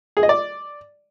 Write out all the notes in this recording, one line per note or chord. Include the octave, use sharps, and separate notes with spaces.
G#4
D#5
D5